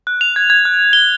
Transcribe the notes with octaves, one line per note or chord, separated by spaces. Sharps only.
F#6
F7
G#6
G#6
F#6
G7